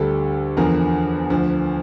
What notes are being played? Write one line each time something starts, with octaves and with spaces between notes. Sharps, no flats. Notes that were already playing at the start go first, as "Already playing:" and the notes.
Already playing: D2 D3 G3 A4
E2 D3 F3 A#4
D2 D3 F3